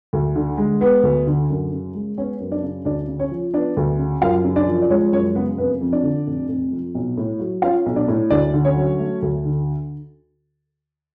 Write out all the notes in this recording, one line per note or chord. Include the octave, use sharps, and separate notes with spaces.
D2
D3
G#3
B3 B4
D2
D3
F#2
C#3
G#3
B3 C#4 C#5
F#2
D4 D5
C#3
D2 D4 D5
C#3
C#4 C#5
F3
B3 D4 D5
D2
C#3
F#2 F4 F5
C#3
D4 D5
F3
D5
G#3 C#4 C#5
F#2 C#4 C#5
C#3 B3 B4
F1 B3 B4
F2
D4 D5
D3
F1
F1
F2
B1
A2
F#3
C#4 F4 F5
B1
D4 D5
A2
D2 D4 D5
D3
C#4 C#5
F#3
A3
D2
D3